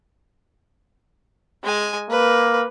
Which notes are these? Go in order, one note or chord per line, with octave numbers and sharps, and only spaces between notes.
G#3 G#5
A#3 B4